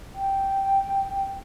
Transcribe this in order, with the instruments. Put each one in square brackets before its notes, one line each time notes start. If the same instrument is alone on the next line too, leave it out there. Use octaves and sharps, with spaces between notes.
[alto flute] G5